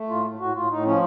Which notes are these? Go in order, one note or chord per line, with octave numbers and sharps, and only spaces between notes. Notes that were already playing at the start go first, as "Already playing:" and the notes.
Already playing: A3
A2 F4
A2
A2 F#4
A2 F4
A2 D#4
F3 C#4